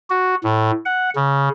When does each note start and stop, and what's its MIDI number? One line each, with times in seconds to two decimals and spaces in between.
0.10 0.35 66
0.44 0.71 45
0.86 1.10 78
1.16 1.49 49